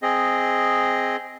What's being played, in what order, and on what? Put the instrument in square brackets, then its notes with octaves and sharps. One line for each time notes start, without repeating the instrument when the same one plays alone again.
[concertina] C4 G#4 D#5